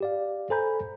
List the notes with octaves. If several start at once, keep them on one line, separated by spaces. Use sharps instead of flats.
G4 D5 F5
A4 C5 G#5 A#5 B5 G6